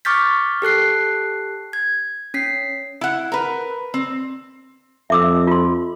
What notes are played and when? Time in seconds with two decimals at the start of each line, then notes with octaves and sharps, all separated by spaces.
0.05 C#6 D6 F6 G6 A6 B6
0.62 G4 A4 F#6 C7
1.73 G#6
2.34 C#4 B6 C7
3.01 E4 F#5
3.32 A#4 B4
3.94 C4
5.10 F2 E5 D6 E6
5.47 F4 C6